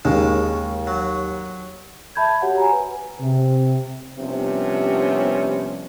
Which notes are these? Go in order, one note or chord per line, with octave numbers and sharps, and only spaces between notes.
D#2 C#3 G#3
F#3
E5 A5 B5 G6 G#6
F#4 G4 C#5 F#5
G#5 A#5
B4
C3
C3 F3 G3 B3 C#4 D4